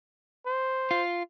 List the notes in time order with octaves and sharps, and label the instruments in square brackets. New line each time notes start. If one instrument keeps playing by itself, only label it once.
[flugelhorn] C5
[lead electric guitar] F4